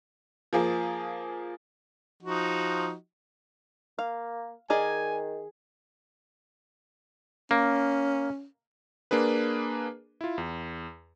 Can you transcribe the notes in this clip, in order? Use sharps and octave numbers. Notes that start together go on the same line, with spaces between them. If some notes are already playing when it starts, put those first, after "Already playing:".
F3 A#3 G#4
F3 D#4 F#4
A#3 F5
D#3 G#4 A#4 D5 D#5 G#5
A#3 C#4
A#3 D4 G#4 B4
E4 F4
E2